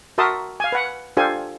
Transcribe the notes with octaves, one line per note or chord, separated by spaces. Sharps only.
F#4 A#4 E5 A5 C6 D#6
F5 G#5
B4 F#5
D4 F4 G4 A4 C5 G#5